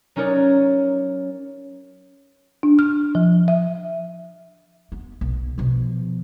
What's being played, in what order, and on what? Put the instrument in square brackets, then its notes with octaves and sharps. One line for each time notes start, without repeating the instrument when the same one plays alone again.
[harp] F#3 C#4 D#4 A#4 C#5 D5
[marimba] D4
F6
F3
E5
[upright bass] B3
B1
B2 F3